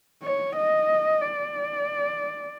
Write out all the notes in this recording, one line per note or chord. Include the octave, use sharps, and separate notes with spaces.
C#5
D#5
D5